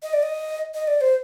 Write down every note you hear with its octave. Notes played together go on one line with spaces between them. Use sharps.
D#5
D5
D#5
D#5
D5
C5